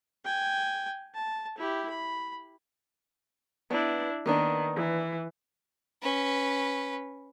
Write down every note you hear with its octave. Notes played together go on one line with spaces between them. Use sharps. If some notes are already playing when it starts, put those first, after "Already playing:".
G5 G#5
A5
E4 G4
B5
B3 D4 E4
D#3 A#3 B3 D4
E3
C#4 B4